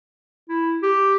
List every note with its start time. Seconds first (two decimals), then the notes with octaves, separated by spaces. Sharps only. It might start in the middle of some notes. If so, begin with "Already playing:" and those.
0.49 E4
0.83 G4